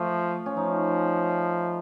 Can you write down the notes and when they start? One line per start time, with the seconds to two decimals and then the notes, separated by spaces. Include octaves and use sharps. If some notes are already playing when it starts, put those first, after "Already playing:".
Already playing: F3 A3
0.46 C#4
0.56 F3 D#4